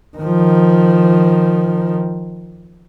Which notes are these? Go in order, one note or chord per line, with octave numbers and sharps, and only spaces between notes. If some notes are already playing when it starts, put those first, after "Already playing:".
D#3 F3